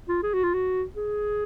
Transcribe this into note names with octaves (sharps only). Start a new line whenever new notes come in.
F4
G#4
F#4
F4
F#4
G#4